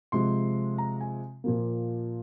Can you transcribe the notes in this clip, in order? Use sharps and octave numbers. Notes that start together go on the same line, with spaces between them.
C3 F3 G#3 C6
A#5
G#5
A#2 F3 A#3